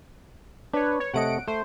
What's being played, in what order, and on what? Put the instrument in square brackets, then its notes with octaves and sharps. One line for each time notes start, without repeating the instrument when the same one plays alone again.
[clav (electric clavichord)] D4 [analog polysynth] B4 C#5
[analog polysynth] C#5
[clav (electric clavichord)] C3 A3 D#5 [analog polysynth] F#5 D7
[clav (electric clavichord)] A3 [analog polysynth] C5